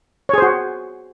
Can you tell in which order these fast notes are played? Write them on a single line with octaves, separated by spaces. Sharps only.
C#5 G#4 C5 F#4